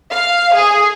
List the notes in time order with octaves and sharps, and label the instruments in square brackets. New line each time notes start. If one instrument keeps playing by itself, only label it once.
[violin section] F5
G#4